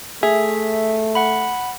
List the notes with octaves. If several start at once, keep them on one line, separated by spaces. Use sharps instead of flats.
A3 G#4 E5
F#5 B5